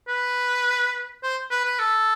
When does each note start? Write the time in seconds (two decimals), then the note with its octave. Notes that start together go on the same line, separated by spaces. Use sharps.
0.08 B4
1.23 C5
1.50 B4
1.65 B4
1.79 A4